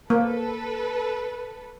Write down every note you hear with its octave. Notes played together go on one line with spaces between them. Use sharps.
A#3 A4 B4